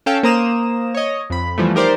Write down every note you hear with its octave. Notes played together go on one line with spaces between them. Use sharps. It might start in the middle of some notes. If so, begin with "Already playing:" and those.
C#4 A4 F5 G5 A5
A#3 C5 A#5 D#6 E7
C#5 D#5
F2 B5
E3 F3 G3 A3
D#4 G4 A#4 C5 D5